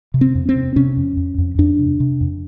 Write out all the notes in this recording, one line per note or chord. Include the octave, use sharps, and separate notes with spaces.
C3
C4
F2
C4
C3
C3 C#4
F2
F2
F2
F2 D4
C3
C3
F2